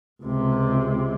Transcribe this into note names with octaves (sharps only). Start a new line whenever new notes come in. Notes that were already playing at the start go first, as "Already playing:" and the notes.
C#2 C3